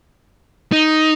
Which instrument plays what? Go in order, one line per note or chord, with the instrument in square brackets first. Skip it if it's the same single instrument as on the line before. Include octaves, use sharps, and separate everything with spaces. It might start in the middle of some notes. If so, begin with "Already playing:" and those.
[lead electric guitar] D#4